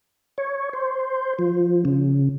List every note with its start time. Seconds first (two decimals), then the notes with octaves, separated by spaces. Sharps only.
0.38 C#5
0.73 C5
1.39 F3
1.85 C#3